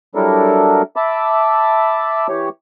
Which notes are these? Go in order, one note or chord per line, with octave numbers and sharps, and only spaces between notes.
F#3 G3 D4 E4 A4 A#4
E5 A5 B5 D6
E3 G4 C#5